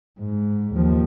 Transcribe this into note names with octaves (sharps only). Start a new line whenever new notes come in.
G#2
D#2 F3